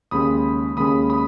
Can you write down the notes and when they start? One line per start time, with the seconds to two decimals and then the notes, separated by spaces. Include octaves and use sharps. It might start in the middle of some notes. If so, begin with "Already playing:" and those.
0.11 D#2 C#3 G#3 C#4 B5 D#6
0.77 D#2 C#3 G#3 C#4 B5 D#6
1.10 B5 D#6